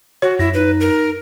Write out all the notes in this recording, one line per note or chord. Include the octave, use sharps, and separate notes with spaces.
F#4 C#5
F#2 E4 A#6
D#4 B4
A#4